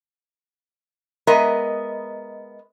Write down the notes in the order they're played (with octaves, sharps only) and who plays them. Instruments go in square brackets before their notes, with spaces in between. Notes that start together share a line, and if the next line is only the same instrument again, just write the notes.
[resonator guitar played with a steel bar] G#3 B3 A#4 D#5 E5